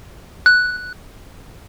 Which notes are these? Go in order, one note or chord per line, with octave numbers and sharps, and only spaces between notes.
F#6